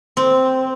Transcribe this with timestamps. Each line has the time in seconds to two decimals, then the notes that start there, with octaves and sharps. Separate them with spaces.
0.17 C4